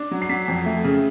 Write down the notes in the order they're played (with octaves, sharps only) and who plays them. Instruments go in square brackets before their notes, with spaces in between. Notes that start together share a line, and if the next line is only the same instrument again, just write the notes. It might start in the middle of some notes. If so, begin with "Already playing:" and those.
Already playing: [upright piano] D4
F#3
C7
F#3 B6
F2
A3
C#3